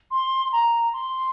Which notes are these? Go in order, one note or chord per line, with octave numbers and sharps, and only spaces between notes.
C6
A#5
C6